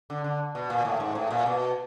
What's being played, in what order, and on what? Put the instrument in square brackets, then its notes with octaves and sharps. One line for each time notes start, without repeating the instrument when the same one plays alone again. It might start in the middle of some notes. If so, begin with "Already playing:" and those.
[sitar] D3
D3
B2
A#2
A2
G#2
A2
A#2
B2